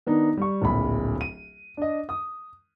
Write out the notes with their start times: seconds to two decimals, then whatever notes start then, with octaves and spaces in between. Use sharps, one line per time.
0.07 D#3 B3 D4 D#4
0.37 G3 C#6
0.62 D1 A#1 B5
1.21 D#7
1.77 D4 D#5
2.09 D#6